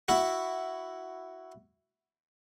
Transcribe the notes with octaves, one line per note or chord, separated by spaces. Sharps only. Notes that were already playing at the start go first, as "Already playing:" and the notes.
E4 F#4